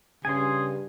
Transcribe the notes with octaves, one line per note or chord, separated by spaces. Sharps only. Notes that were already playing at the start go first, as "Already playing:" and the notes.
G2 C#3 G#4 G#5 C6